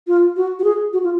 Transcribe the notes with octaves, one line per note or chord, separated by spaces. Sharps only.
F4
F#4
F#4
G#4
F#4
F4